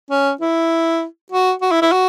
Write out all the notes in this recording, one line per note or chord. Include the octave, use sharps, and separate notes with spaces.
C#4
E4
F#4
F#4
E4
E4
F#4